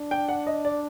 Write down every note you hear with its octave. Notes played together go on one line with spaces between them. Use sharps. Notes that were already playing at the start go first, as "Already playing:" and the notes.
Already playing: D4
G5
F#5
D#5
D5